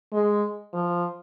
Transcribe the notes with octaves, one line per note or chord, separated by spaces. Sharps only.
G#3
F3